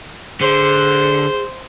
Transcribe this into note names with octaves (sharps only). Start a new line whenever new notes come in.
D3 G#4 C5